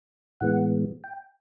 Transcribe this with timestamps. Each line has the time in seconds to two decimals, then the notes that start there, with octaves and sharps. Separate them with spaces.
0.41 A2 E3 G#3 B3 F#5
1.04 G5